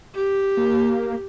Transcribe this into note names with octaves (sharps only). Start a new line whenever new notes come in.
G4
A#3